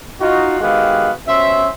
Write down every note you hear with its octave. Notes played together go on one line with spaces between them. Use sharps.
D#4 F4 F#4
D#3 G#3 B3 F#4 G4 F5
B2 C#4 C5 E5